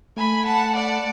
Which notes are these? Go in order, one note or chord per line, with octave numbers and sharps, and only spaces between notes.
A3 G#5 B5
F#5 A5
D5 F#5